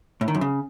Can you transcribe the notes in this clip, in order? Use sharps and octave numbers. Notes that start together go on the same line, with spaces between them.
A2
D#3
F#2
C#3